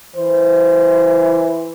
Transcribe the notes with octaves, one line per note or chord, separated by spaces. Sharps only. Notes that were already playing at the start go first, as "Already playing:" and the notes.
E3 C5